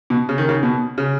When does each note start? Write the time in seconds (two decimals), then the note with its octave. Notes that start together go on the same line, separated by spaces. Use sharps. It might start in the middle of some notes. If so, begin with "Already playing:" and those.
0.10 B2
0.29 C#3
0.38 D#3
0.49 C#3
0.63 B2
0.98 C#3